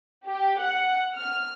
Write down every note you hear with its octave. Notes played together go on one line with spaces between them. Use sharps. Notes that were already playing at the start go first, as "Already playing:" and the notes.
G4
F#5
F6